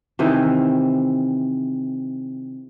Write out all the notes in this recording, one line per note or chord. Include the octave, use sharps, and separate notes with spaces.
C3 D#3 E3